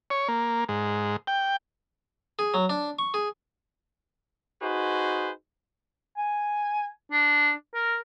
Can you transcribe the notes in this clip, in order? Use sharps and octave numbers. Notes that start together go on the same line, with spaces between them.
C#5
A#3
G#2
G5
G#4
F#3
D4
C#6
G#4
D#4 F#4 G#4 B4 C5
G#5
D4
A#4